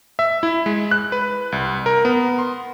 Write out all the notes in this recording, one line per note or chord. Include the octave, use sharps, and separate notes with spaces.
E5
E4
G#3
F#6
B4
C2
A#4
B3
C6